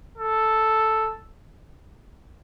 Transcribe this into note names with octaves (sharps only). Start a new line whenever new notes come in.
A4